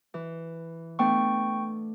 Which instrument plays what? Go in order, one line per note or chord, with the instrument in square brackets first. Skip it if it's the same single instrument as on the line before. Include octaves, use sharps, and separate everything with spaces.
[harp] E3
[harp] A3 B3 D4 [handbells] G5 C#6